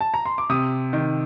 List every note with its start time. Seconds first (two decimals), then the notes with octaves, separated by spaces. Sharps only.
0.01 A5
0.14 A#5
0.25 C6
0.38 D6
0.49 C3 D#6
0.93 D#3